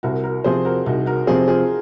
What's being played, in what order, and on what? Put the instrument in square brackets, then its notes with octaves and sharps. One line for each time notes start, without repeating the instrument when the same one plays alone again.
[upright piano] C2 [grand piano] F#4 A#4
[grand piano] F#4 A#4
[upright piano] C3 F3 C4 [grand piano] G#4 C5
[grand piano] F#4 A#4
[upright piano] C2 [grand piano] D#4 F#4
[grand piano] F#4 A#4
[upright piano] C3 F3 C4 [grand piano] G#4 C5
[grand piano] F4 G#4